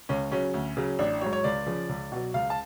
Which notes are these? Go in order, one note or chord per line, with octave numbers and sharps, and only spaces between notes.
C#2 C#4
C#3 F#3 C#4
D2
C#3 F#3
A1 D4
G#2 F#3 C#5
C#5
C#2 D5
C#3 F3
C#2
B2 F#3
C#2 F5
A5